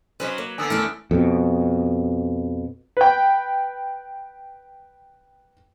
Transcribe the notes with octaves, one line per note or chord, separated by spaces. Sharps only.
F#3 C#4 B4 C5 D#5
A#3
D3 B3 G#5 D#6 E6
A3 C#4 E4 A5 F6 D7
F2 B2
B4 G5